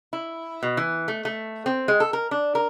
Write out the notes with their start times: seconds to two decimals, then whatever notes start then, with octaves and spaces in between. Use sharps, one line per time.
0.13 E4
0.63 B2
0.77 E3
1.08 A3
1.25 A3
1.66 C4
1.88 G#3
2.00 A4
2.13 A#4
2.31 D4
2.55 A#4